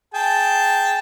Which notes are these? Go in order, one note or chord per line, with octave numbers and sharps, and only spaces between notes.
G#4 G5 A5